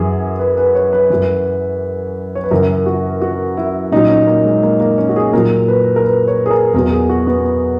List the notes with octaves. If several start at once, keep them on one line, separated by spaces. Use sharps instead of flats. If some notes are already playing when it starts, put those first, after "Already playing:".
Already playing: F#2 E3 G#4
B4
B4
C#5
B4
F#2 E3
C#5
B4
F#2 C#3 E3 A#4
F#4
F#4
E4
A#2 F#3 D#4
C#4
A#3
G#3
A#3
A#3
C#4
F#4
G#4
A#2 F#3 A#4
B4
A#4
B4
C#5
G#4
A#4
E2 B2 F#3 A#4
G#4
F#4
B3